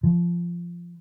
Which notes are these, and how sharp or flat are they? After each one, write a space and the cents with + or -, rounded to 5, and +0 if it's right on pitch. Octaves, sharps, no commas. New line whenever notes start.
F3 -10